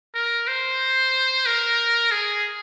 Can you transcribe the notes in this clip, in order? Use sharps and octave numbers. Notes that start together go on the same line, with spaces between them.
A#4
C5
A#4
G#4